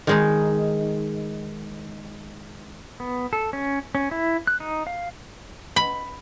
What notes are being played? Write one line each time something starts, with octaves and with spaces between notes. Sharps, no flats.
D#3 G#3 D#4
B3
A4
C#4
C#4
E4
F#6
D#4
F5
B5